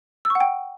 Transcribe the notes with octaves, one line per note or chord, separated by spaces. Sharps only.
E6
C#6
F#5
G5